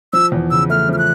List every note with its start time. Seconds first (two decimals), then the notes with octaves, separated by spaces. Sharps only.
0.13 F3 E6
0.32 E2
0.51 C#3 E6
0.70 A3 F6
0.89 F3 F6
0.98 F#6